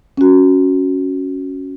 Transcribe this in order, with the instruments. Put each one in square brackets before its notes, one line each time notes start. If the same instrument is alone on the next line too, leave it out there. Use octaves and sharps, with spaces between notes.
[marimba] C#4 F#4